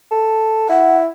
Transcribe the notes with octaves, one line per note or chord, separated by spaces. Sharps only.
A4
E4 F#5